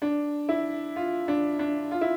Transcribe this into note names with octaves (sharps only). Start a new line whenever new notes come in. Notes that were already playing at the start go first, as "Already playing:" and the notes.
D4
E4
F4
D4
D4
F4
E4